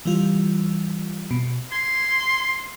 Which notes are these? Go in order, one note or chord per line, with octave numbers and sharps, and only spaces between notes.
E3 G3 F4
B2
C6 G#6